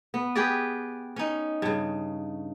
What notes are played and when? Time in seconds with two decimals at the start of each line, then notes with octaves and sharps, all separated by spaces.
0.14 B3
0.35 G4 G#4 B4 D5
1.16 C#4 D#4
1.62 G2 C#3